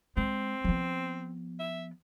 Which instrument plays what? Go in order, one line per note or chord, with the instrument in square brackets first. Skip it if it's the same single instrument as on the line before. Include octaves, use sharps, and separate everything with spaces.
[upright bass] G#3 [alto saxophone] C4
[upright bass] F3 B3
[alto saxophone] E5